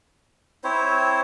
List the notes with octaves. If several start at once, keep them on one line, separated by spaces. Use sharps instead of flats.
C4 E4 C5 C#5